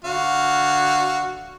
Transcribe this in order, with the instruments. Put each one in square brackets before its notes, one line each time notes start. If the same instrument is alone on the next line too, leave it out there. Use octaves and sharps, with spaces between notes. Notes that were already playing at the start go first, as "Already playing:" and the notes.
[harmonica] D3 F#4 F5